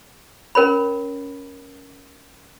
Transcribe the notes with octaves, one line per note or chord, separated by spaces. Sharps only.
C#4 A#4 C#5 B5